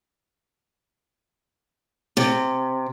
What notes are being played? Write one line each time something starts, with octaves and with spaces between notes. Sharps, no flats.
C3